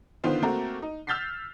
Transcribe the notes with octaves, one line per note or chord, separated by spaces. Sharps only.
D3 D#3 B3 F4 C5
A3 A#3 C4 F#4 A#4
D#4
E6 F6 G6 A6 B6 C7